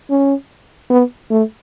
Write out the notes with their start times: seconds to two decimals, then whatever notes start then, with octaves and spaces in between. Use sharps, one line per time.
0.10 C#4
0.90 B3
1.30 A3